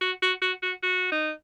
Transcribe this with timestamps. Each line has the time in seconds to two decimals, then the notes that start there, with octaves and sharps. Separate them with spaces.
0.01 F#4
0.22 F#4
0.42 F#4
0.63 F#4
0.83 F#4
1.12 D#4